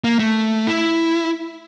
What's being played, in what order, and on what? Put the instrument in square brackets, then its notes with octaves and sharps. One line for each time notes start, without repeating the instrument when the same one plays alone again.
[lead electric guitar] A#3
A3
E4